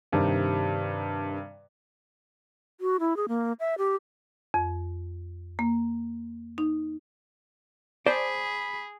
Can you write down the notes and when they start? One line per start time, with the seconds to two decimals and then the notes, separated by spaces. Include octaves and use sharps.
0.12 G2 C3 D#3
2.81 F#4
3.00 E4
3.17 G#4
3.28 A#3
3.60 E5
3.78 G4
4.54 F2
5.59 A#3
6.58 D#4
8.06 G#4 C5 D5 A5 B5